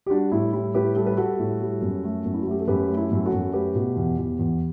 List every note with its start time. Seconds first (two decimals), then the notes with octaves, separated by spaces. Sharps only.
0.06 G4
0.10 G3 D4 F#4
0.32 A2 E4
0.53 G3 E4
0.74 A2 G4 B4
0.96 G3 A4
1.06 B4
1.17 G3 F#4 A4
1.39 A2
1.61 G3
1.82 F#2
2.04 A3
2.25 F#2
2.34 E4
2.42 F#4
2.47 A3 G4
2.60 A4
2.68 F#2 G4 B4
2.90 A3
2.96 E4 G4
3.12 F#2
3.25 F#4 A4
3.33 F#2
3.53 A3 G4 B4
3.75 B2
3.96 E2
4.18 E2
4.39 E2